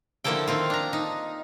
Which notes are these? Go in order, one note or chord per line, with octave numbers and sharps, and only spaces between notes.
D3 F3 A#3 E4 A4 G5
D#3 C4 F4
D4 A#5
D#4